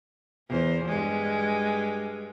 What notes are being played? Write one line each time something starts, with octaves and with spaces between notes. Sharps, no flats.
E2 C5
G2 G#3